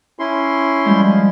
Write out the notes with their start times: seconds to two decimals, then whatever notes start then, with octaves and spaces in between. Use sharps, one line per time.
0.19 C#4 E4 C6
0.85 F3 G3 G#3